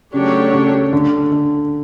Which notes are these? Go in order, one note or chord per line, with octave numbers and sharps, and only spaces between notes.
C#3 F#3 A3 D4 G4 C#5
C#3
D3
D3